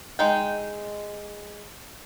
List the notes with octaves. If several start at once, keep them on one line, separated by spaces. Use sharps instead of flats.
G#3 D#4 G5